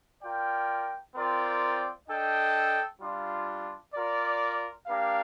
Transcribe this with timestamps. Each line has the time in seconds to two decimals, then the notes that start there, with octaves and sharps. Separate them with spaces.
0.22 F4 A#4 D5 G5
1.15 C4 F4 A#4 D5 G5
2.08 D4 A4 D#5 G5
3.00 G3 D4 F4
3.94 F4 A#4 D5
4.87 A#3 D4 G4 A#4 F5